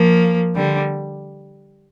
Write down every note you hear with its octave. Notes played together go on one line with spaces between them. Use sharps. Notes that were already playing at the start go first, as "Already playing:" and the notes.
Already playing: F3 A#3
D3 G3